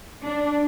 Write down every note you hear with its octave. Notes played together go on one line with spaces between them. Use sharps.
D4